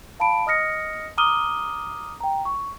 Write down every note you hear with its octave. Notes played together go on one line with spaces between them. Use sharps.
F5 A5 B5 D7
D#5 D#6 F6 A#6 C#7
A#5 D6 D#6 F6 D#7 G7
G5 A#5
C#6